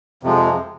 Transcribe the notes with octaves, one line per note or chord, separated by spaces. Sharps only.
F2 C3 F3 G#3